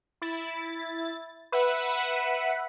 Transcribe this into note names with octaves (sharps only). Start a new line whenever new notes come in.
E4 A6
B4 E5 F#5